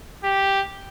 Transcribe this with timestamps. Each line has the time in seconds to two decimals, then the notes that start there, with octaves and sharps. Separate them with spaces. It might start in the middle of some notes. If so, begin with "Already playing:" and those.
0.24 G4